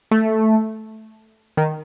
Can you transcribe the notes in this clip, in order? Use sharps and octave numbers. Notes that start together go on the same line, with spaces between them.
A3
D#3